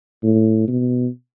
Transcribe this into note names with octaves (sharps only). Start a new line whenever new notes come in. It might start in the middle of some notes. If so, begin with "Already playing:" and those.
A2
B2